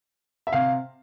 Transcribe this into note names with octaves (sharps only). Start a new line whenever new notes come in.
E5
C3 F5